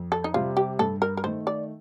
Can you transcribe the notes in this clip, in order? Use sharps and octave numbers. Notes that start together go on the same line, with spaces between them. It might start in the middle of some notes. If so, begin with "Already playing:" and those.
Already playing: F2
A4
D#4
C3 G3 F4
G4
G2 A4
A#4
A#4
D#3 A3 C5
D5